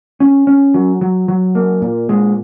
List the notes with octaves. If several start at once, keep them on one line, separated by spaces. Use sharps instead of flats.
C#4
C#4
F#3
F#3
F#3
A#3
A#2
G#3